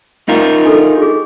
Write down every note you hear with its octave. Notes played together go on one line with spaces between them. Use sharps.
D#4 F4 A#4
D4 A4
G4 G#4